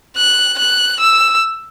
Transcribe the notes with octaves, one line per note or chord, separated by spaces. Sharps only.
F#6
F#6
E6